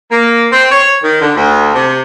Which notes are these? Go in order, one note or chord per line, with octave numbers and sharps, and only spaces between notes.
A#3
C4
C#5
D#3
D3
D2
C3